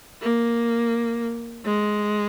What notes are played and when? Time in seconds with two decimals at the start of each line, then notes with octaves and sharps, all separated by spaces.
0.22 A#3
1.65 G#3